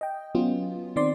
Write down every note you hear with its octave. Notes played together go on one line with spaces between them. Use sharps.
D#5 G5
F#3 B3 C#4 F4
D#3 C4 D5 C6